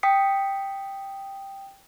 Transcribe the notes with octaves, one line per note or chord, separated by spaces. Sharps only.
G5 D#6 B6 C#7